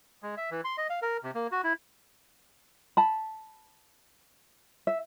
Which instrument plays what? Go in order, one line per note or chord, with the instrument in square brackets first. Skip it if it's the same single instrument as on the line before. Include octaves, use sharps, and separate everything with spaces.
[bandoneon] G#3
E5
E3
C6
D#5
F5
A#4
C3
A#3
F#4
E4
[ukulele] A5 B5
E5